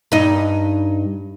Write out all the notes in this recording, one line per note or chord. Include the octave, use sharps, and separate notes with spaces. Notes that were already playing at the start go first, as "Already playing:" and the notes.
G2 D#4